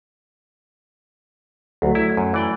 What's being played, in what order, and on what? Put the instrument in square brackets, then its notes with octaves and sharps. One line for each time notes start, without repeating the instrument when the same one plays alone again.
[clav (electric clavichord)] D2 [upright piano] F#3 A3
[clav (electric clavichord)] E4
F#2
E3 D5 G5